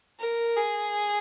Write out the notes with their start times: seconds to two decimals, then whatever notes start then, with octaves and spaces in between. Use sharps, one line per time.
0.19 A#4
0.56 G#4